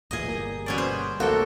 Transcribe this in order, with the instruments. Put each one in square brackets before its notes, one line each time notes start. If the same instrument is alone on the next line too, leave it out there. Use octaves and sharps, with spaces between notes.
[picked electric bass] D1 A#2 E3 [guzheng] G#4 D#5
[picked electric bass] G1 G3 A#3
[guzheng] B2 C#4 D5
C5
[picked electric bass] D2 C3 [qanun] A#3 A4 G5 [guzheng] F#4